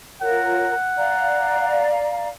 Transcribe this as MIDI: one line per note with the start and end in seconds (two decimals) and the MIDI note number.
0.22 0.74 65
0.22 0.74 70
0.22 0.74 73
0.22 1.93 78
0.97 2.29 74
0.97 2.29 77
0.97 2.29 82